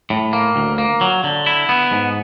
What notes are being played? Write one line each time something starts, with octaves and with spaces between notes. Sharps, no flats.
A2
A#3
D2
A#3
F#3
D3
E4
B3
G#2